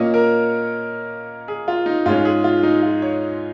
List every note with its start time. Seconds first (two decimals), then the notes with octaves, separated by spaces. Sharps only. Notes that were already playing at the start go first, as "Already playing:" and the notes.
Already playing: A#2 A#3 C#4 C#5 D#5
0.14 A#4
1.48 G#4
1.68 F4
1.86 D#4
2.06 G#2 G#3 C#4 F4
2.25 G#4
2.44 F4
2.63 D#4
2.83 F4
3.02 C#5